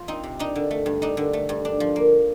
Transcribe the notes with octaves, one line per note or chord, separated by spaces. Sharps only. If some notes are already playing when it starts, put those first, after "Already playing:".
Already playing: F4
C4 D#4
C3
D4 D#4
D3
A3
G2
D4 D#4
D3
A3
G2
D4
F3
A#3